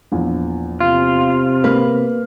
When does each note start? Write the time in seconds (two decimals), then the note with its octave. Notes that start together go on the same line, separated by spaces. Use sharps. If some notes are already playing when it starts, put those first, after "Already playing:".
0.12 A#1 E2
0.80 C3 F4
1.64 A#3 B4 F6